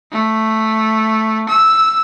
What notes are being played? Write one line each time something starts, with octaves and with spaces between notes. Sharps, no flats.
A3
E6